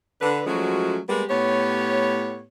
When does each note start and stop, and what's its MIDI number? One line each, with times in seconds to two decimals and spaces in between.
0.21 0.42 50
0.21 0.42 71
0.46 0.98 53
0.46 0.98 54
0.46 0.98 56
0.46 0.98 57
0.46 0.98 61
0.46 0.98 66
1.08 1.23 55
1.08 1.23 56
1.08 1.23 58
1.08 1.23 59
1.08 1.23 67
1.29 2.42 45
1.29 2.42 59
1.29 2.42 67
1.29 2.42 73